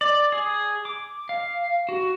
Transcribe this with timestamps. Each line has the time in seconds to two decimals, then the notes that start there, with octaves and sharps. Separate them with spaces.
0.01 D5
0.32 G#4
0.85 D6
1.29 F5
1.89 F#4